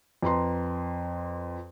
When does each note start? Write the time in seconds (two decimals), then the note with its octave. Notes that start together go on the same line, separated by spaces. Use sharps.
0.23 F2 B4 A#5 C6